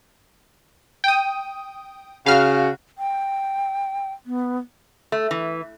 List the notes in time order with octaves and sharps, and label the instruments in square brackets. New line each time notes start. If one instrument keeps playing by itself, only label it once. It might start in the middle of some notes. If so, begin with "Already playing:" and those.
[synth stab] G5 D#6
[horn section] C#3 F#4 [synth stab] F5 F6
[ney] G5
B3
[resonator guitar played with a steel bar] A3
E3